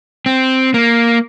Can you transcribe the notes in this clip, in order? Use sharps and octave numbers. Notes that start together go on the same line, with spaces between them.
C4
A#3